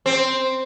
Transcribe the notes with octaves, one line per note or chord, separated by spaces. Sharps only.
C4